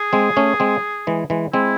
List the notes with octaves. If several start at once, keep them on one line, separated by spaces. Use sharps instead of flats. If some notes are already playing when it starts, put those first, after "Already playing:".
Already playing: G#4
G#3 C4
A3 C#4
G#3 C4
E3 G#3
E3 G#3
G#3 C4 E4